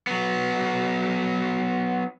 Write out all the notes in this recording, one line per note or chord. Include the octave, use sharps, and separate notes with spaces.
F#3 B3